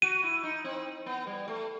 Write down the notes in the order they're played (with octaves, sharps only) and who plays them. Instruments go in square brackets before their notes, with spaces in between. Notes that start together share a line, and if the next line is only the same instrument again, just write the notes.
[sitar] F#4 [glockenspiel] D#7
[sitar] E4
D#4
C4
B3
G3
A3